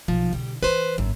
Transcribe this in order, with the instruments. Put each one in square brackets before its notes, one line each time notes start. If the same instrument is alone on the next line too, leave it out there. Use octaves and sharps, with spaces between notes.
[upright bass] B1 D#4 [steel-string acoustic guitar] F3
[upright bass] B2 D3 [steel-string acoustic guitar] G3
[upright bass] E3 C4 [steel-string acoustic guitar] B4 C5
[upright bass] G#1 A#3 [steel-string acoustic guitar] F#2